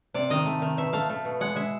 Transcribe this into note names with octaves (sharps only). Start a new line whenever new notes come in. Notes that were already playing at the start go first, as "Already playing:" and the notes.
C3 D5
D#3 D#5
A3
D#3
B2 E5
A3 F5
A3
B2
G#3 F#5
G#3 E5